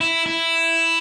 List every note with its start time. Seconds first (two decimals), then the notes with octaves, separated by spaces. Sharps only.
0.01 E4
0.26 E4